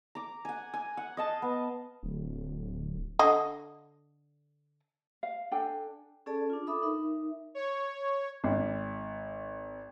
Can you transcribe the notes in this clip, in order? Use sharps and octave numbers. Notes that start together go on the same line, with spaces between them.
A#5 D6
F#5 G#5
G#5
F#5
D#5 F5 A5
B3
D1
D3 D#5
F5
D4 A4 G5 G#5
C#4 G#4 A4 D5 A5
D4 F4
A4 E5 B5 D6 D#6
D#4 A#4 E5
C#5
G#1